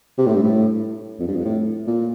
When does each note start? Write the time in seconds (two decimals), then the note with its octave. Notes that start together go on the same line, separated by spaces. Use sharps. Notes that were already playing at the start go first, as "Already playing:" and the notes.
0.18 C3
0.26 A2
0.35 G2
0.43 A2
1.19 F2
1.28 G2
1.36 F2
1.45 A2
1.87 A#2